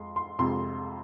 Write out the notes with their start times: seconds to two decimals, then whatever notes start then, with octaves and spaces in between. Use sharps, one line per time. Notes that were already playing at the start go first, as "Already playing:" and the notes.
Already playing: F2 G#3 C6
0.16 C6
0.39 F2 C3 G#3 C6